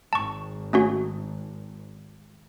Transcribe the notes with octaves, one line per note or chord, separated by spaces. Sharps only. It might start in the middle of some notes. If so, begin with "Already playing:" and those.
G#1 A5 C#6
A3 C#4 F#4